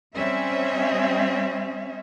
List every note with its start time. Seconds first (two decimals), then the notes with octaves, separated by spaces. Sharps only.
0.15 G3 C4 C#4 E5